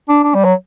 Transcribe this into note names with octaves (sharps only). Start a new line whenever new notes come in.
D4
D4
G3
F#3